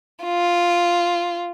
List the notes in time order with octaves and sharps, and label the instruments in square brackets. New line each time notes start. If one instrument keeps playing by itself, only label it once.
[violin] F4